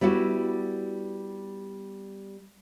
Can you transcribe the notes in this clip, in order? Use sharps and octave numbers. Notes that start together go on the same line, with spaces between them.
G3 B3 E4 F#4